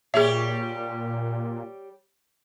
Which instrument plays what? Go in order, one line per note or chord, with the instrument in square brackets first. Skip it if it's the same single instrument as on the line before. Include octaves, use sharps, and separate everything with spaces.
[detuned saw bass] A#2 [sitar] G3 G4 C#5 [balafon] G#4 E5